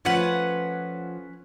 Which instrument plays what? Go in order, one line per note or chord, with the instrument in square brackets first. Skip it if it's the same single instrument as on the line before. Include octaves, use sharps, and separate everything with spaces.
[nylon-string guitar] F3 A3 F4 [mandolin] C#4 B4 F#5